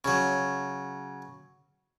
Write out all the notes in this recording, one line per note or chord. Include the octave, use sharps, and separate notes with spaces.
C#3 F#3